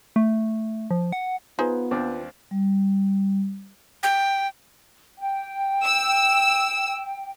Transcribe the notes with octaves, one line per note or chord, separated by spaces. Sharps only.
A3
F3
F#5
B3 D#4 F4 G#4 B4 C5
D#2 C4 D4
G3
G5
G5
E6